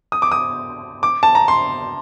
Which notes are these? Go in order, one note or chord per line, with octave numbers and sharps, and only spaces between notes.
D#6
D6
D#6
D6
A5
A#5
C6